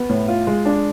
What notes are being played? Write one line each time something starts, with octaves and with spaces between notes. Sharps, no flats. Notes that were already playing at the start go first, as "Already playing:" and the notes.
Already playing: B3
A2
F4
G#3
D4